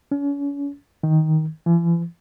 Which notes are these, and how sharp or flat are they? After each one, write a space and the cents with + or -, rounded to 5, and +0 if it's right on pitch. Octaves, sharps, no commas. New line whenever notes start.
C#4 +35
D#3 +10
E3 +45